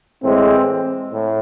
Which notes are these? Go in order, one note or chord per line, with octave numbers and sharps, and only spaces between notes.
A2 E3 G#3 C4
A2